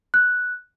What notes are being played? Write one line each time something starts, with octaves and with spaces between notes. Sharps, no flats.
F#6